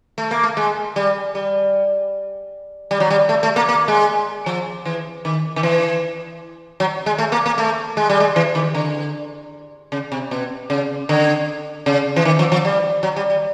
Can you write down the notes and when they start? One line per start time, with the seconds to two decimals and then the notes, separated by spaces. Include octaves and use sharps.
0.18 A3
0.31 A#3
0.43 A3
0.57 G#3
0.96 G3
1.35 G3
2.91 G3
3.00 F#3
3.10 G3
3.29 A3
3.43 A3
3.56 A#3
3.69 A#3
3.88 G#3
4.46 F3
4.85 E3
5.25 D#3
5.56 D#3
5.63 E3
6.80 F#3
7.06 G#3
7.18 A3
7.32 A#3
7.46 A#3
7.58 A3
7.97 G#3
8.09 G3
8.20 G#3
8.36 E3
8.55 D#3
8.75 D3
9.92 C#3
10.12 C3
10.31 B2
10.70 C#3
11.09 D3
11.86 C#3
12.16 E3
12.25 D#3
12.39 F3
12.52 F3
12.65 G3
13.03 F#3
13.16 G3
13.30 G3